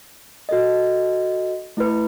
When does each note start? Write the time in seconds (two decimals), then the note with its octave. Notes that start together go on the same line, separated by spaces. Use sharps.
0.49 F#4 A4 D#5
1.77 A3 E4 B4